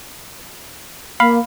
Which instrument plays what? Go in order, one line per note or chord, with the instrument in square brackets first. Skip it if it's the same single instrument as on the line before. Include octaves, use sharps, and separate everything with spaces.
[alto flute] A#3 [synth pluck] F5 B5